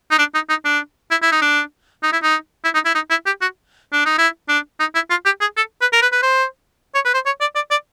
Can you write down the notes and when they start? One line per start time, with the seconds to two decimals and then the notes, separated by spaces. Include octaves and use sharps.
0.11 D#4
0.19 D4
0.34 D#4
0.50 D#4
0.65 D4
1.11 E4
1.22 E4
1.32 D#4
1.42 D4
2.03 D#4
2.13 E4
2.23 D#4
2.64 E4
2.74 D#4
2.86 E4
2.95 D#4
3.10 E4
3.26 G4
3.42 F#4
3.93 D4
4.06 D#4
4.18 E4
4.49 D4
4.80 D#4
4.95 E4
5.10 F4
5.25 G4
5.41 G#4
5.57 A4
5.81 B4
5.93 A#4
6.02 B4
6.13 B4
6.23 C5
6.95 C#5
7.05 B4
7.14 C5
7.26 C#5
7.41 D5
7.55 D5
7.71 D5